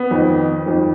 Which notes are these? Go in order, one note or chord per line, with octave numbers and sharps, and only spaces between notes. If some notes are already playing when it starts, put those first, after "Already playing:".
Already playing: B3
F2 D#3
F2 D#3